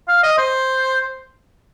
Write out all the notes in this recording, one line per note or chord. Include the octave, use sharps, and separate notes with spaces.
F5
D#5
C5